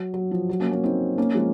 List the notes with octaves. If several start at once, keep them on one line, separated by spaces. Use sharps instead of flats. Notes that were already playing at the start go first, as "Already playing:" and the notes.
Already playing: F#3
F#3
F3
F#3
A#3 C#4
A#3 C#4
C4 D#4
A#3 C#4
F3 G#3